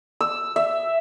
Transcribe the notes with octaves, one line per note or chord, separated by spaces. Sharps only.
E6
E5